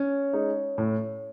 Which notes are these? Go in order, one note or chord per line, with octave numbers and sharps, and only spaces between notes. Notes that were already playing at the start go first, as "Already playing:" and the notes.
Already playing: C#4
G#3 D#4
A2